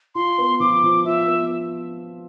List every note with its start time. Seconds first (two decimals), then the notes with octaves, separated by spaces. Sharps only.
0.15 F4 C6
0.38 B3
0.60 F3 D6
0.83 F3
1.04 F4 E5
1.27 B3